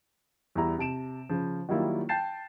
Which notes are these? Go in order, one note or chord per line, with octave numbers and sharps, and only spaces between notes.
E2 G3 E4 A#5
C3 A5 D7 E7
C#3 F3
D#3 F#3 G3 A#3 E4 F4
G5 A5 G6 A6 C7 E7